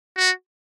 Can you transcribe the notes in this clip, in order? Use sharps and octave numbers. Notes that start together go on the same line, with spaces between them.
F#4